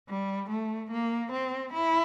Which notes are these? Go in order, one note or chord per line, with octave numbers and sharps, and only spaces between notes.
G3
A3
A#3
C4
E4